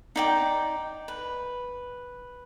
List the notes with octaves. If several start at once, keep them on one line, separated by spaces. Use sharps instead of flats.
D#4 D5 G5
B4